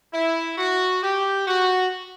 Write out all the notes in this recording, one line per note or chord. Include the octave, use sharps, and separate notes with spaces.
E4
F#4
G4
F#4